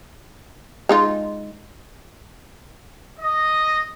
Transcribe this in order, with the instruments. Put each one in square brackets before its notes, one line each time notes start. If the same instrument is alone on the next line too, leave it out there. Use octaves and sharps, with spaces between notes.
[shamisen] G#3 D#4 F4
[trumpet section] D#5